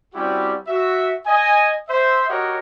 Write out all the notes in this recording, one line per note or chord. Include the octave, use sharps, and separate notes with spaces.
G3 C4 C#4 E4 F#4 G4
F#4 E5
D#5 G#5
C5 E5
F#4 G4 A#4 C#5 D#5 F#5